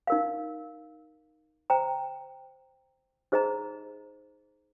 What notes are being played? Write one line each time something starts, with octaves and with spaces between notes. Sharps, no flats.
D#4 A#4 F5
C5 G5 A#5
D#4 G#4 C5 D#5 A#5